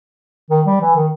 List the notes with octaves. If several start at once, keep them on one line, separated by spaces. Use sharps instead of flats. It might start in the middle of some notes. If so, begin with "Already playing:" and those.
D#3
G3
E3
D#3